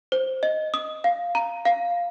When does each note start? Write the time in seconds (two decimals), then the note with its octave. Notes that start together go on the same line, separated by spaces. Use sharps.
0.12 C5
0.43 D#5
0.74 D#6
1.04 F5
1.35 A#5
1.65 F5